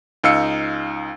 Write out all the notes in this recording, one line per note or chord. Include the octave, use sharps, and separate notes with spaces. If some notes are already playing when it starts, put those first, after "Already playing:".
C#2 D#4 F5 E6 C#7